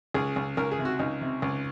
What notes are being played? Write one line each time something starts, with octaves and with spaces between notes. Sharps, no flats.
C#2 G#4
C#2
C#2 A#4
G#4
C3
F#4
C#2 D#4
C3
C#2